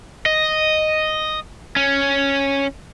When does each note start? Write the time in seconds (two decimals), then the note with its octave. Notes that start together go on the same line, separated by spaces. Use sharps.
0.26 D#5
1.76 C#4